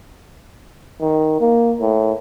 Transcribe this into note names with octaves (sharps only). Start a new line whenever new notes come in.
D#3
A#3
A2